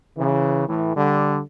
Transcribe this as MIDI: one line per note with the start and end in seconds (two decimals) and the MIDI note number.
0.18 0.67 49
0.18 0.67 52
0.68 0.92 45
0.68 0.92 52
0.96 1.40 50
0.96 1.40 55